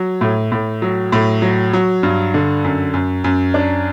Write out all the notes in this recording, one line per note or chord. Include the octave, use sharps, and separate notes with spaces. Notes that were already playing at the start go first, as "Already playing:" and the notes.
Already playing: F#3
A2
A2
F#3
A2
F#3
F#3
G2
D3
F#2
F#2
F#2
D4